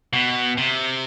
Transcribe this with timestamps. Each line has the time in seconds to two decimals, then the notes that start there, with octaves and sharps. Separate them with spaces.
0.13 B2
0.57 C3